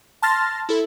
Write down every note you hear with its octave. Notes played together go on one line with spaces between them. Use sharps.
A5 C6 F6 A6 A#6
E4 A4